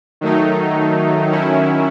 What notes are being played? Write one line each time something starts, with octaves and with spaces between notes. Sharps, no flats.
D#3 F#3 A3 D#4
D#3 F#3 C#4 E4